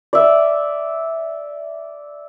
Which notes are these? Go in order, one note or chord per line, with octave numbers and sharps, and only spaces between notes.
D5 E5